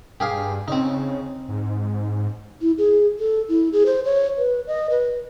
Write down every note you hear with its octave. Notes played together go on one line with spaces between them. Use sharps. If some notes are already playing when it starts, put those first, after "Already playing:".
G2 G4 G#4 F5
C#3 C4 D#4
G#2
E4
G#4
A4
E4
G#4
C5
C#5
B4
D#5
B4